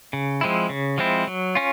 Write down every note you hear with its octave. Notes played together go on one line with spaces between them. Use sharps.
C#3
F3 G#3 C4 E4
C#3
F3 G#3 C4 E4
F#3
C#4 F4